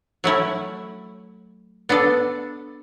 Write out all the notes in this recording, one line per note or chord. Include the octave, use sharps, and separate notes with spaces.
F#3 A3 C#4 E4
B3 D4 A4